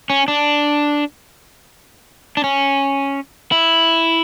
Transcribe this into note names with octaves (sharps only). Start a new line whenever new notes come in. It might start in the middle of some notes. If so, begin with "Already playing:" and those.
C#4
D4
D4
C#4
E4